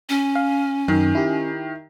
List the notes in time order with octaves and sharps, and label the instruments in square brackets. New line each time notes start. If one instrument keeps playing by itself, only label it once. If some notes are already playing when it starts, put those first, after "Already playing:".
[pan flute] C#4
[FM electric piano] F5
[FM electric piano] F#2 [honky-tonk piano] D#3
[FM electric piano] E4 G4